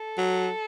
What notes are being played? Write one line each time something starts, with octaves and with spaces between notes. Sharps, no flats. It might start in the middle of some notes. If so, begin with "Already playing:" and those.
Already playing: A4
F#3